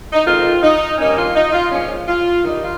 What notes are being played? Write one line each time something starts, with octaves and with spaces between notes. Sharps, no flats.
D#4
F2 D#3 G#3 C4 F4
D#4
G2 D#3 A#3 C#4 D#4
F4
D#4
F4
A#2 F3 G#3 C#4
F4
G2 D#3 G3 D#4
F4